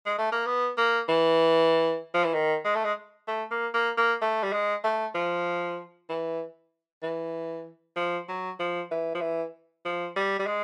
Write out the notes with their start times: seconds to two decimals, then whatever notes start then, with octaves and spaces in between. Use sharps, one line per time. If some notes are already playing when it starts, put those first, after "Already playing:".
0.06 G#3
0.18 A3
0.32 A#3
0.46 B3
0.78 A#3
1.08 E3
2.14 F3
2.24 E3
2.34 D#3
2.65 G#3
2.75 A3
2.84 G#3
3.27 A3
3.51 A#3
3.74 A#3
3.97 A#3
4.21 A3
4.43 G3
4.53 G#3
4.84 A3
5.15 F3
6.09 E3
7.03 E3
7.96 F3
8.29 F#3
8.59 F3
8.91 E3
9.15 F3
9.21 E3
9.85 F3
10.16 G3
10.39 G3
10.47 G#3